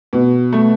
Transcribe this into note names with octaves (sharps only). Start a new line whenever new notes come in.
B2
A3